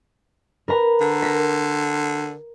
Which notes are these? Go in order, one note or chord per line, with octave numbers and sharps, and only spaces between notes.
A#4 B4 A#5
D3
A#6 B6